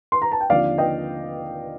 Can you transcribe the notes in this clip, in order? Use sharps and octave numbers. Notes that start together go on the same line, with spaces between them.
C6
A#5
A5
G5
D#2 D3 F3 C4 D5 F5
D#5 G5